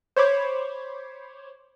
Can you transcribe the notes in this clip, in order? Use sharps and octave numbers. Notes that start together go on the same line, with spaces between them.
C5 C#5 B5 D6 G#6